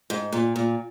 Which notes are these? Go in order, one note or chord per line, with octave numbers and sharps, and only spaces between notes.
G#2
A#2
A#2